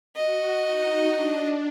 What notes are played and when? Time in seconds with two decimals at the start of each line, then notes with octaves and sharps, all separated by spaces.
0.16 F#4 D#5
0.63 D#4
1.10 D4